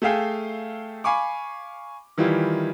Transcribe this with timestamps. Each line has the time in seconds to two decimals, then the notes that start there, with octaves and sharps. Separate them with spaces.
0.02 A3 G#4 E5 F5 G5 G#5
1.04 F5 G#5 B5 C#6 D6
2.17 D#3 E3 G3 E4 F4